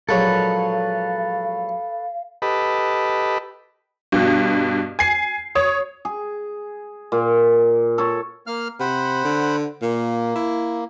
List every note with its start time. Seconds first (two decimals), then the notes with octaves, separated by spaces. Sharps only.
0.09 A#1 F#3 G#3 A4 B4 C#5 F5
2.42 G4 A4 B4 D#5 B5
4.12 G2 B2
4.99 G#5 C7
5.55 C#5 D#6
6.05 G#4
7.12 A#2
7.98 A4 C#5
8.47 A#3 F5 F6
8.80 C3 C5 F#5 B5
9.25 D3
9.82 A#2 A#3
10.35 E4